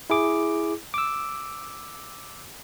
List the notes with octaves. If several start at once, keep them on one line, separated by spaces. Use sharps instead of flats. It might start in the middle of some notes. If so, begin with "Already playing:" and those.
E4 G#4 D6
D6 E6